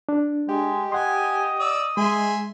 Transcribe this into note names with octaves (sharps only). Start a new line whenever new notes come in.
D4
G#3 G4
D#5 F#5 G#5 C6
D5 E6
G#3 G#4 E5 G#5 C6